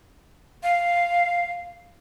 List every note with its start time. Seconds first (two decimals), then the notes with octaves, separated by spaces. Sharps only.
0.63 F5